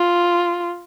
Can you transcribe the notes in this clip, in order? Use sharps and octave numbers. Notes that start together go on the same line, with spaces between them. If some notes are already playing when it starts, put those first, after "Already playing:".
Already playing: F4